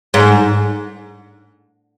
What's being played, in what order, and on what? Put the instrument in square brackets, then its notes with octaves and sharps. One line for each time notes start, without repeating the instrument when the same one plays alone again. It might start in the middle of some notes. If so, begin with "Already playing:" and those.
[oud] G#2